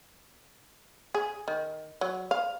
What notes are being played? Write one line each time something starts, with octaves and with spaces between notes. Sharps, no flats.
G#4
D#3
F#3
F5